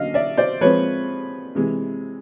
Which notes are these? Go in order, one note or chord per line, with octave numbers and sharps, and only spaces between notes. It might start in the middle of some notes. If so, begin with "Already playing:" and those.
Already playing: D3 F#3 A#3 C#4 D#5 F5
D5 E5
C5 D5
F3 G#3 C4 B4 C#5
C3 E3 G#3